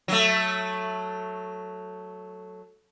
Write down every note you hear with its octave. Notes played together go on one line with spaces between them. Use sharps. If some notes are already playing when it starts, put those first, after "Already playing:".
F#3 A3